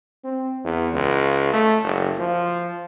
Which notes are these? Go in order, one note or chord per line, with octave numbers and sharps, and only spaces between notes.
C4
E2
C#2
A3
F#1
F3